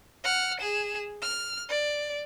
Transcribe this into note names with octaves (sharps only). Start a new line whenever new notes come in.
F#5 F6
G#4 E7
F6
D5